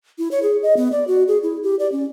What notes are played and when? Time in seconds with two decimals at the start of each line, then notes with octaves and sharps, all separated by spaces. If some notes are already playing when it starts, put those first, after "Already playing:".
0.18 E4
0.31 C#5
0.43 G#4
0.63 D#5
0.77 B3
0.92 D5
1.08 F#4
1.28 G#4
1.43 E4
1.63 G4
1.79 D5
1.92 C#4